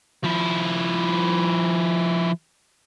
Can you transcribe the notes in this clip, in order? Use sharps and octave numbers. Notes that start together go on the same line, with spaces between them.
F3 E4